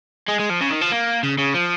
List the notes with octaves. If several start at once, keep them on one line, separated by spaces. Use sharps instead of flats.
G#3
G#3
F3
C#3
D#3
F3
A#3
C#3
C#3
F3